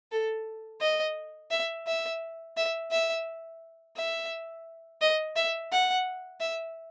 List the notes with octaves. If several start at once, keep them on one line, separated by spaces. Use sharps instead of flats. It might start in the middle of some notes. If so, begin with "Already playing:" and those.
A4
D#5
E5
E5
E5
E5
E5
D#5
E5
F#5
E5